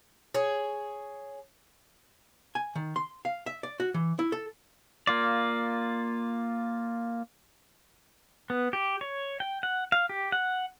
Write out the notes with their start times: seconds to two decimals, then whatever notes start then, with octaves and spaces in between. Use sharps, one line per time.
0.34 G#4 C#5
2.55 G#5
2.75 D#3
2.96 C6
3.25 F5
3.46 E5
3.63 D5
3.80 F#4
3.94 E3
4.19 E4
4.32 A4
5.07 A#3 F4 D5
8.50 B3
8.73 G4
9.01 C#5
9.40 G5
9.63 F#5
9.92 F5
10.09 G4
10.32 F#5